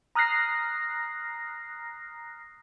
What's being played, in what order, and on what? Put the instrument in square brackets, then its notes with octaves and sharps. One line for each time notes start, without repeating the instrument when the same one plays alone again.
[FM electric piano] A#5 D#6 F6 F#6 A#6 C7